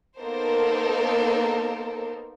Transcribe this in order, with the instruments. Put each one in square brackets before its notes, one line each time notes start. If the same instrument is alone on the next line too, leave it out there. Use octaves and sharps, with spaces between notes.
[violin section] A#3 B3 D#4 A4 A#4 C5